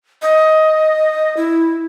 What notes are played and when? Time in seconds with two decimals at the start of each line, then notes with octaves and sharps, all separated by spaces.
0.22 D#5
1.37 E4